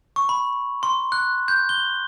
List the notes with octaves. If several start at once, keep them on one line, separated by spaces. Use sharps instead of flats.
C#6
B5
C6
F#6
G6
G7